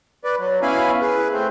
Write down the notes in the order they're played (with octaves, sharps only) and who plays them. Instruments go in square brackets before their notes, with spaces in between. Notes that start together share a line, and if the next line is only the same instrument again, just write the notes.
[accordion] B4 D5
F#3
B3 C#4 E4 F5 G#5 B5
G#4 B4
A3 C4